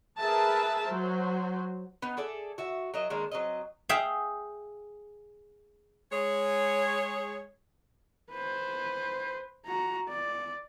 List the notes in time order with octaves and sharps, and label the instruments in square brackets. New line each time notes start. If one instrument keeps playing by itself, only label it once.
[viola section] G#4 A#4 B4 E5 A5
F#3 C5
[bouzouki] B3 D#4
G#4 A4 D5 E5
F#4 E5
F#3 A#4 D#5 E5
D#3 G#3 A#3 D4
F#3 C4 D#5
[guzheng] G#4 E5 F5 G5
[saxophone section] G#3 G#4 C#5
[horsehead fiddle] B4 C5
F#4 A#5
D5